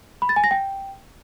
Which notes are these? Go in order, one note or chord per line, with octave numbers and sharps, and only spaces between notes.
B5
A6
G#5
A#6
G5